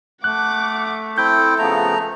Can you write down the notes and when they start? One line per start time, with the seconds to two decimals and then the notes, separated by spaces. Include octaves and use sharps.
0.24 A3 F#5 D6 F#6
1.18 C4 E4 A4 G5 G6
1.59 C#3 F3 A3 B3 A#5